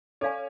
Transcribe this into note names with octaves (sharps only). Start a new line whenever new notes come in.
C#4 A4 C#5 D5 F5 G#5